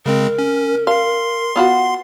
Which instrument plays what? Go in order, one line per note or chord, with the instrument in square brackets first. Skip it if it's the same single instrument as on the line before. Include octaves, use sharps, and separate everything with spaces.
[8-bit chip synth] C#3 G#3 C4 [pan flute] A#4
[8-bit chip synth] C#4
[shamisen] F5 [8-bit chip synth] C6 C7
[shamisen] B3 F4 F#4